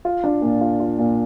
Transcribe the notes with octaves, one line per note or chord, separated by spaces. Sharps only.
F4
D4
A#2
F4
F4
A#2